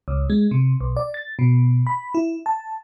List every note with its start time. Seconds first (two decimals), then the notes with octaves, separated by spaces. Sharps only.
0.08 C#2
0.30 G#3
0.51 C3
0.81 B1
0.97 D5
1.14 A6
1.39 B2
1.87 B5
2.15 E4
2.46 A5